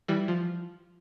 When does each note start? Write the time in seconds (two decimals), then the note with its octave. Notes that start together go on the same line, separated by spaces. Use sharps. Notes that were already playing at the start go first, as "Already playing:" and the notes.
0.08 E3 G3
0.28 F3